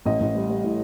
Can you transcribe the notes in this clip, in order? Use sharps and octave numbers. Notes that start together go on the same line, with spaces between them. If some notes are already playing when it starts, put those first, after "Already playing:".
A1 D#5
A1
G3
G3
A2